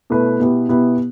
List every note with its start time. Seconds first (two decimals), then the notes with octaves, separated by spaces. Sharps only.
0.10 B2 A3 E4 B4
0.40 B2 B3 E4 G4
0.68 B2 B3 E4 G4